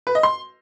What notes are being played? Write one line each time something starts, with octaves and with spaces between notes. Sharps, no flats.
B4
D#5
C6